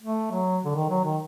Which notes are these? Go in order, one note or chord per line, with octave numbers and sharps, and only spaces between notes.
A3
F#3
D3
D#3
F#3
D#3